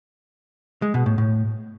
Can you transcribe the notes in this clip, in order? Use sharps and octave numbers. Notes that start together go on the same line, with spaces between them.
G#3
B2
A2
A2